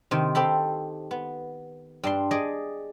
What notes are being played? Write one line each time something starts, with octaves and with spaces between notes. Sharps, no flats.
C3 D#3
C4 G4 A4 B5
B3
G2 D4 C6
G#4 D5 D#5